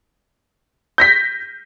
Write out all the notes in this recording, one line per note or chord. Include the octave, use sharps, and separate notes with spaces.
G6 A#6 B6